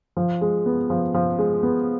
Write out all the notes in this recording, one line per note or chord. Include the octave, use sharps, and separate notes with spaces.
F3
G#3
B3
F3
F3
G#3
B3